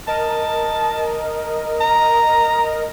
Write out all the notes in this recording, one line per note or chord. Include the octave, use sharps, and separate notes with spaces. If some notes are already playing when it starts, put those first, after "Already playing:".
A#4 D#5 A5
A#5